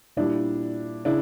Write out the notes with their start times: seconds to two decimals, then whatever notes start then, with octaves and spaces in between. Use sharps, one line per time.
0.17 A#2 G3 D4 E4
1.05 C#3 D4 E4